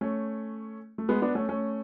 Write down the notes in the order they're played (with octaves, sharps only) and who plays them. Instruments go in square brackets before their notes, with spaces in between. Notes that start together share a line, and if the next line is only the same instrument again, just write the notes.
[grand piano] A3 C#4
A3
G#3 B3
B3 D4
A3 C#4
A3 C#4